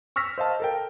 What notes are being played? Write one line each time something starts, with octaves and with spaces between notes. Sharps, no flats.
C#6 E6 F6 A#6 B6
C5 D#5 F5 A5
A4 A#4 G5